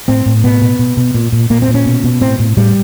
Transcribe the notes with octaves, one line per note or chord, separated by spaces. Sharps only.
A2 C4
A2
B2 B3
B2
B2
B2
A#2
A#2
A#2 A#3
C4
A#2
C#4
B2
B2
A2 C4
A2
A2 G3